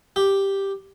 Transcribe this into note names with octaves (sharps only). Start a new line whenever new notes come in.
G4